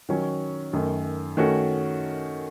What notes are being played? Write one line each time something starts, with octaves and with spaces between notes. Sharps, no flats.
D#3 F#3 C#4
F#2 D#3 A3
D#3 A3 C#4 F#4